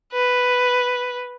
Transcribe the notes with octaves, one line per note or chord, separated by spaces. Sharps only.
B4